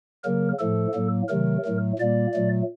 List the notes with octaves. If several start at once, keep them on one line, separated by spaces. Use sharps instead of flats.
C#3 F#3 A#3 A#4
A2 F3 A3 A4
A2 F#3 A#3
C3 D#3 F#3 A3 A#4
A2 F#3 A3
A#2 G3 A#3 D5
A#2 F#3 A3